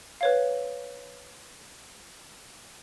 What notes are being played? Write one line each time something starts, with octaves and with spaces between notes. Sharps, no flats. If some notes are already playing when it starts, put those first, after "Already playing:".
B4 C#5 F5